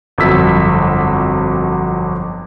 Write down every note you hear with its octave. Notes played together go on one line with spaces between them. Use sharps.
G1 F2 F#3 E6 B6